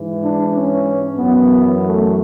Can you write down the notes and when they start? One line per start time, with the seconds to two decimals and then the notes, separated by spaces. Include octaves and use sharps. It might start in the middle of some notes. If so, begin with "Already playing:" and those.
Already playing: G#2 E3
0.20 D4
0.53 C#4
1.18 F#2 E3 B3
1.83 A3